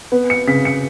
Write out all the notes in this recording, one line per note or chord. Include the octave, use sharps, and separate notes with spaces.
B3
C#7
C#3 B6
C#7